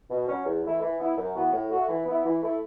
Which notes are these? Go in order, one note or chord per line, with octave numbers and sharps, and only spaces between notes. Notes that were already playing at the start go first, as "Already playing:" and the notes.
B2
F#3 C#4
E2
E3 A3 E4
E3
B3 E4
F#2
E3 B3 F#4
A2
A3 F#4
E3
B3 E4
E3
A3 E4